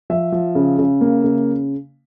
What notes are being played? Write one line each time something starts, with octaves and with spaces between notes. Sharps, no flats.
F3 E5
F3
C#3
C#3
A#3
C#3